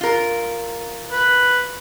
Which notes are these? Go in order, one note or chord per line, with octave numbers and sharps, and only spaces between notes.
F4 A#4
B4